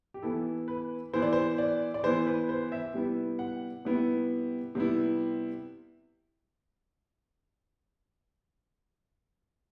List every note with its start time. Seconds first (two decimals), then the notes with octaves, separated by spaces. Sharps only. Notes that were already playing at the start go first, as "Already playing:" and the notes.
0.14 G4
0.22 E3 B3 E4 A4
0.68 B4
1.13 E3 B3 E4 C5
1.22 D5
1.33 C5
1.58 D5
1.94 D5
2.03 E3 B3 E4 C5
2.27 B4
2.49 C5
2.72 E5
2.94 C3 G3 B3 E4
3.39 F#5
3.85 C3 G3 B3 E4
4.75 C3 G3 B3 E4